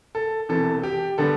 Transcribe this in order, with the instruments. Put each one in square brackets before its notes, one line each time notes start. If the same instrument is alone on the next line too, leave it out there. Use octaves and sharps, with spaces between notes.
[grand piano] A4
E1 E2 C3 E3 A4
G4
D3 G3 B3 A4